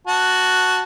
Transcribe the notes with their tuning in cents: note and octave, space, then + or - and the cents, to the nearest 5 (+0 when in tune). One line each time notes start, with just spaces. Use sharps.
F#4 +0 A5 +0